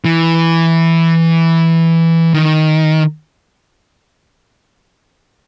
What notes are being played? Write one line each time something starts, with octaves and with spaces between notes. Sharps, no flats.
E3
D#3